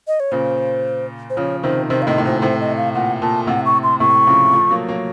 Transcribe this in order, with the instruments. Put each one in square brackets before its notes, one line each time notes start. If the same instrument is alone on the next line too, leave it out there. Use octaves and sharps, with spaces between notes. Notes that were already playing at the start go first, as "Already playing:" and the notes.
[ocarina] D#5
C#5
[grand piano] A#2 C#3 [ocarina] C5
[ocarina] C5
[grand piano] C#3 F3 [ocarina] C#5
[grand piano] C3 D#3 [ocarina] C5
[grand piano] C3 D#3 [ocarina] C5
[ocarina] F5
[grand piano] A2 C3 [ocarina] D#5
[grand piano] A2
[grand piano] A#2 [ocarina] C5
[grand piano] A2 C3 [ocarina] C5
[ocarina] D#5
F5
[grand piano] A#2 [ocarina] F#5
[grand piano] A#2 [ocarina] A5
[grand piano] A2 C3 [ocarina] F#5
[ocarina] C#6
C6
[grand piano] A2 C3 [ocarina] C#6
[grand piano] C#3 F3
F3 A3
F#3 A#3
F#3 A#3